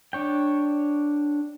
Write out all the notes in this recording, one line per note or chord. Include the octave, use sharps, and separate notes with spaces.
D4 C#5 G5